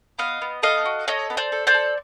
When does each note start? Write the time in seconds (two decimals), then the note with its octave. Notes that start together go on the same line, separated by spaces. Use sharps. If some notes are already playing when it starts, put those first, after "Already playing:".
0.19 B3 D#5 F5
0.42 B3
0.63 A4 D#5 F5
0.85 F#4
1.07 A4 C#5 D#5
1.30 B3
1.37 C5 D5
1.52 A4
1.67 C5 D5
1.74 A4